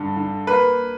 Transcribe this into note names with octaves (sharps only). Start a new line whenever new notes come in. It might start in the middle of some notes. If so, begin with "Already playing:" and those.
Already playing: G2 D3
D3
A#3 B4